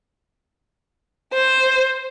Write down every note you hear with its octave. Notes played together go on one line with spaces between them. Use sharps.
C5